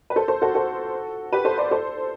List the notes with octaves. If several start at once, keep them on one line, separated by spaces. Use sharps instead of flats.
B4
A4 C5
A4 C5
F#4 A4
F#4 A4
G4 B4
A4 C5
B4 D5
A4 C5